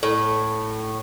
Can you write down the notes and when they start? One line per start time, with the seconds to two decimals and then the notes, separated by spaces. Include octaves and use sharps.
0.03 A2